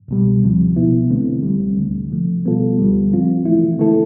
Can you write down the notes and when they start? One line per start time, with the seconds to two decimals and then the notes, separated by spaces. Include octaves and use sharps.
0.08 C2 B2 G3
0.43 D2 C3 F3
0.76 C2 B2 B3 E4
1.10 D3 A3 C4
1.43 C2 C3 G3
1.77 D2 D3 A3
2.10 C3 F3 A3
2.45 B2 G3 B3 F4 A4
2.78 D2 D3 G3
3.11 A2 F3 C4 F4
3.45 E3 A3 E4
3.79 D3 A3 E4 A4